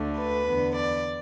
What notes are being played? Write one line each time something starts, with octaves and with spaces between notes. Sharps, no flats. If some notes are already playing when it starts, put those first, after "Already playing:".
Already playing: D2 D3 A3
B4
E2 D3 B3
D5